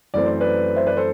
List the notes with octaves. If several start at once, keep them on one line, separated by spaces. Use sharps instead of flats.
F#2 E3 A3 C4 D5
C5
B4 D5
C5 E5
B4 D5
A4 C5